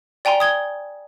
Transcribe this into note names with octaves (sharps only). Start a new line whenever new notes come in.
D5 G5 G#5 A#5 C6
D#6 G#6 G7